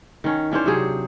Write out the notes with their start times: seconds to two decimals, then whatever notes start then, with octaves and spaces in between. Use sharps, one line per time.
0.24 D#3 C#4
0.51 E3 C#4 D4 C5
0.65 C3 F#3 G#4